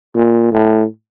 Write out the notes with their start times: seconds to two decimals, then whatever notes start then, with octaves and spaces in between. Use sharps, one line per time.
0.16 A#2
0.52 A2